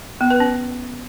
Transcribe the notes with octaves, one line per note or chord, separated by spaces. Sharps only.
B3
B4
C#4